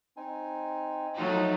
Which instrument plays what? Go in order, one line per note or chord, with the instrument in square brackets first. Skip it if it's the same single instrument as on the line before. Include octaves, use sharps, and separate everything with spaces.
[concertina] C4 D#4 G#5
[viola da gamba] F3 F#3 A3 [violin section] D#4